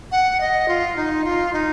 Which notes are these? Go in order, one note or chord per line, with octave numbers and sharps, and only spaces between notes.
F#5
D#5
F4
D#4
F4
D#4